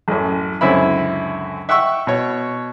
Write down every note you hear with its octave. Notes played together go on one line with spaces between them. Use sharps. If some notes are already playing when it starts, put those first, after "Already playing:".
A1 F#2
C#2 F#2 D3 C4 E4 B5
E5 F#5 G5 C#6 E6
B2 C#5